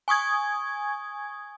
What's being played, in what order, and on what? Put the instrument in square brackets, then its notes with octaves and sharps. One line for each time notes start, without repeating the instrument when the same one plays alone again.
[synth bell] G#5 C#6 D#6 G#6